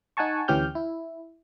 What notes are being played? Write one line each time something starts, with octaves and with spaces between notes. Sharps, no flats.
D#4 F#5 G#5 A5 C#6
D2 E3 C#4 G4 F6 G6
E4